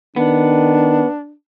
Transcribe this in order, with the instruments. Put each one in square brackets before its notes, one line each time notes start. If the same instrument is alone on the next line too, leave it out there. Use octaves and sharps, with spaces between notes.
[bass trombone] D#3 [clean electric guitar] B3 [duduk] D4